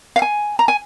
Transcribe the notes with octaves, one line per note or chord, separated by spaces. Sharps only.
F5
G#5
A#5
G#5